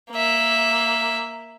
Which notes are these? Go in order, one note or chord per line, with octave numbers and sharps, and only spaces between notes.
A#3 E5